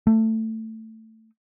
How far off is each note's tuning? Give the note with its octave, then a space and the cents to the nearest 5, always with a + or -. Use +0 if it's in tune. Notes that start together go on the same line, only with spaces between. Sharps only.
A3 +15